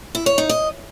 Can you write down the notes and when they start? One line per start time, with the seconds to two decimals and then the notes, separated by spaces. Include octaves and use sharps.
0.15 E4
0.26 C#5
0.38 D#4
0.49 D#5